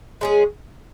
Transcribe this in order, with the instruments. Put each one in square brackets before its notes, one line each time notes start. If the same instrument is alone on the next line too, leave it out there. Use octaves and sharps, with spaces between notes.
[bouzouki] G#3 C#4 G#4